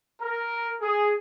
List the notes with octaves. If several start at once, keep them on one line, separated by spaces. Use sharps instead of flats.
A#4
G#4